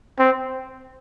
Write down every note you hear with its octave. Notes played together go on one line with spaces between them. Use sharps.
C4